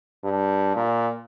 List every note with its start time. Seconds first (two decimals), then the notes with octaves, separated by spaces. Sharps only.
0.24 G2
0.76 A#2